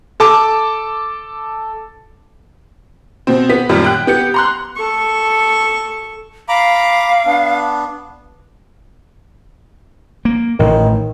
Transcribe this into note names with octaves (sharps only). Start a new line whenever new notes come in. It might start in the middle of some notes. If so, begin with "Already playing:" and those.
A4 A5 D6
B2 C4
B3 B6
F#2 A#2 D#3 G3
G5 F#6
B3 G4 C#7
A#5 C6 F#6
A4 C#6
F5 A#5 B5 D6
B3 D4
A#3
A1 A2 D#3